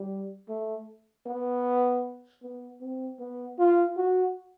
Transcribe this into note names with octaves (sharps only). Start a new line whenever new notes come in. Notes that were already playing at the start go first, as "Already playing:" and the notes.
Already playing: G3
A3
B3
B3
C4
B3
F4
F#4